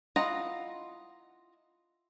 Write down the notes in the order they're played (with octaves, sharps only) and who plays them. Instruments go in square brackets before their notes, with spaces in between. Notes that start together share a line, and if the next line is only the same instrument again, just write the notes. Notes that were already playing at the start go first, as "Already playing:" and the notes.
[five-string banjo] E4 F4 D#5 F#5 A#5